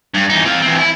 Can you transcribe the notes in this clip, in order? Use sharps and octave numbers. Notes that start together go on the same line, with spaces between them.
G2
E2 D#4
C4 F5
E3 C4
E4